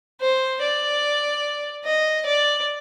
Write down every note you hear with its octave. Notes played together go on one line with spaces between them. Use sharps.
C5
D5
D#5
D5